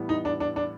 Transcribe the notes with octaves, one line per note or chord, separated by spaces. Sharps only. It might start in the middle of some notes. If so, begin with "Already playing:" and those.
Already playing: A2 E3 G3 B3
D#4
D4
D4
D4